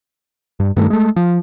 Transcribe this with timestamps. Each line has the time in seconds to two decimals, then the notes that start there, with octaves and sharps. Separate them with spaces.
0.60 G2
0.76 G2 D#3 A3
0.90 G#3 A3
1.16 F3